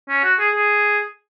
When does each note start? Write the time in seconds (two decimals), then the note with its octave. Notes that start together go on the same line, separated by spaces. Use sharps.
0.09 C#4
0.24 F#4
0.40 G#4
0.56 G#4